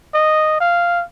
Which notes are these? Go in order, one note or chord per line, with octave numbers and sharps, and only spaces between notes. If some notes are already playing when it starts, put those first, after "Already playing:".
D#5
F5